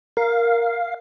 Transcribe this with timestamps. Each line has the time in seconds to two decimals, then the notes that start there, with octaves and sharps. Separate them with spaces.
0.17 A#4 F5